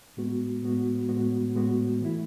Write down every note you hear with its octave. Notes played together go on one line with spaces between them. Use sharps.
A2 G#3 B3 F#4
A2 G#3 B3 F#4
A2 G#3 B3 F#4
A2 G#3 B3 F#4
E3 A3 E4